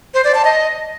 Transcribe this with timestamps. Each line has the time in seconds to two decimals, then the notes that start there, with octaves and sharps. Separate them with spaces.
0.14 C5
0.24 D5
0.35 A5
0.45 D#5